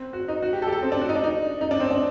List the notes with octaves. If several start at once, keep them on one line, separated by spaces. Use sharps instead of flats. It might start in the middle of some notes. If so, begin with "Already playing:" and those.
Already playing: C4
F#4
D#4
F#4
G4
A4
G4
A4
C4
D4
F#4
D#4
D4
D#4
D#4
D4
C4
D4